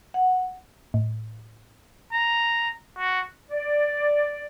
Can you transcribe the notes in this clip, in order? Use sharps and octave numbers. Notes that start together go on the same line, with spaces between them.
F#5
A2
A#5
F#4
D5